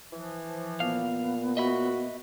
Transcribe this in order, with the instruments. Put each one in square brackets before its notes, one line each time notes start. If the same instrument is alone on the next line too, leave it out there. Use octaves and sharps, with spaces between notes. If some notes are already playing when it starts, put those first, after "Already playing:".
[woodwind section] E3 F3
[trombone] A#2 [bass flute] B3 [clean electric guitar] F5
[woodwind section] F#4 [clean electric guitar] D#5 E5 B5